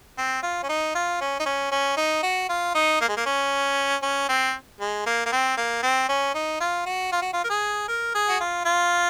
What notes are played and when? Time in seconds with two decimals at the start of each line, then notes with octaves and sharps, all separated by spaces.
0.18 C4
0.43 F4
0.63 C#4
0.69 D#4
0.95 F4
1.21 C#4
1.40 D#4
1.46 C#4
1.72 C#4
1.97 D#4
2.23 F#4
2.49 F4
2.75 D#4
3.01 A#3
3.08 G#3
3.17 A#3
3.26 C#4
4.02 C#4
4.29 C4
4.81 G#3
5.06 A#3
5.26 A#3
5.32 C4
5.57 A#3
5.83 C4
6.09 C#4
6.35 D#4
6.60 F4
6.86 F#4
7.12 F4
7.22 F#4
7.33 F4
7.44 A#4
7.50 G#4
7.88 A#4
8.15 G#4
8.29 F#4
8.40 F4
8.65 F4